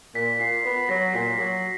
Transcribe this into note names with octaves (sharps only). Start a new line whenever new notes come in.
A#2 B6
A#2 C7
B3
F#3 A#6
A#2 B6
F#3